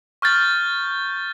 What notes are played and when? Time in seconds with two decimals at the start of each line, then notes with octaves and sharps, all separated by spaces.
0.22 C#6 F6 G6 A6